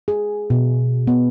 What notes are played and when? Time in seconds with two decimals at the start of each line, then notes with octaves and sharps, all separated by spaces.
0.08 G#4
0.50 B2
1.07 B3